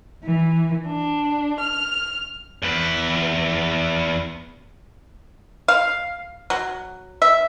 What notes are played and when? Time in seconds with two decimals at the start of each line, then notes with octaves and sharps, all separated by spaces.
0.25 E3
0.87 D4
1.60 F6
2.62 E2 B4
5.68 F5
6.50 F#3
7.22 E5